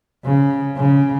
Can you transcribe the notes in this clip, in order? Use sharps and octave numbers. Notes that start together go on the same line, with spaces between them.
C#3
C#3